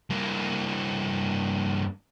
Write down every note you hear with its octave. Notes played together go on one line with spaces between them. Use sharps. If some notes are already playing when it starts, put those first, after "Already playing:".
G2 A#3